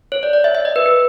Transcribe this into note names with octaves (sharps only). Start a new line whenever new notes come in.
C#5
D5
D5
E5
E5
D#5
B4
B4